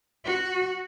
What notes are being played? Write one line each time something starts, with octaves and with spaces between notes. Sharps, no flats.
F#4